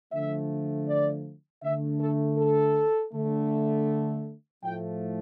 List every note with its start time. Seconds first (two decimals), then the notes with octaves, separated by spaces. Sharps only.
0.13 D3 F3 A3 E5
0.88 D5
1.63 D3 A3 E5
2.00 A4
2.38 A4
3.13 D3 A3
4.63 A2 F3 A3 G5